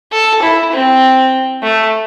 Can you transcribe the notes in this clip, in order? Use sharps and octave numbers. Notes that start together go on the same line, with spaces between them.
A4
E4
C4
A3